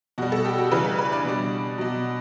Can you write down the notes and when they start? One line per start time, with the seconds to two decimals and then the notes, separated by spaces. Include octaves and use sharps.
0.18 B2 G3 F#4
0.32 A4
0.45 G4
0.58 F#4
0.71 C#3 E3 G3 B4
0.85 B4
0.98 B4
1.12 D4
1.24 B2 G3
1.78 B2 F#3